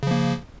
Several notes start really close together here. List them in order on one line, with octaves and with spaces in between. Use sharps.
C#3 F3 A#3